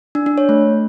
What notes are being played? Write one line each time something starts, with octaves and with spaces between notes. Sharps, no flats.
D4
D4
C#5
A3